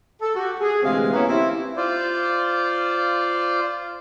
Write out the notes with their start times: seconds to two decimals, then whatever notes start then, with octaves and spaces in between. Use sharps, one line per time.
0.21 A4
0.35 F#4 G4
0.59 G#4
0.83 D2 C3 E3 G#3 C4 F5
1.12 A#3 B3 C#4 E4
1.28 C4 E4 G4
1.77 F4 C5 D5